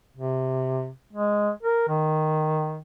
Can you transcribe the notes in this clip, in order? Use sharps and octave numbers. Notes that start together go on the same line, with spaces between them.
C3
G#3
A#4
D#3